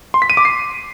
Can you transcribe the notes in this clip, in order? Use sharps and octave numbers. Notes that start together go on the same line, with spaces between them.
C6
B6
D#7
D6
C7